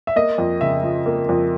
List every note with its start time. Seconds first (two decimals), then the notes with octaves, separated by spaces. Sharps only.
0.07 E5
0.16 A#3 D#5
0.38 F2
0.61 C#3 E5
0.83 F3
1.06 A#3
1.29 F2